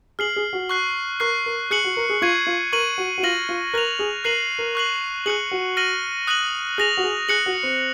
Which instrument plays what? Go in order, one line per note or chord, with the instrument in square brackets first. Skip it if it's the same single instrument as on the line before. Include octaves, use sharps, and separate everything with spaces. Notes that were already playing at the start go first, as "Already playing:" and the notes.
[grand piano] G#4 [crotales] F6 C7 F#7
[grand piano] G#4
F#4
[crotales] C#6 F#6 C7
[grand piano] A#4 [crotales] C#6 F#6 C7
[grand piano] A#4
[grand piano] G#4 [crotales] F#6 C#7 F#7
[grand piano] F#4
A#4
G#4
[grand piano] F4 [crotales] C#6 G#6 C7 D#7
[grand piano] F4
[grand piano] A#4 [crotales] C#6 G#6 D#7 F#7
[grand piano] F#4
F#4
[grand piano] F4 [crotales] F6 A#6 D#7 F#7
[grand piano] F4
[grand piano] A#4 [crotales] F#6 A#6 F7
[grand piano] G#4
[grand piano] A#4 [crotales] F#6 C7 D#7 F#7
[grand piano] A#4
[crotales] C#6 F#6 C7 F#7
[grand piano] G#4 [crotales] F#6 C#7 F#7
[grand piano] F#4
[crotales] F6 A#6 D#7 F#7
D#6 F#6 A#6 D#7 F#7
[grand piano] G#4 [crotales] F#6 A#6 F7
[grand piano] F#4
G#4
[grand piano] G#4 [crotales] F#6 C#7 F#7
[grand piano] F#4
C4